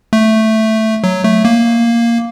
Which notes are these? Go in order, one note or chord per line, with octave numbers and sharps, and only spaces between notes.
A3
F#3
A3
A#3